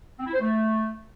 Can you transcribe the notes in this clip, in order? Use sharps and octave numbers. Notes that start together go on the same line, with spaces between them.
C4
E4
C5
A3